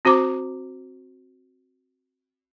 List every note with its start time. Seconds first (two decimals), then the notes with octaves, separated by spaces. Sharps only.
0.05 C4 F#4 C5 A#5 D6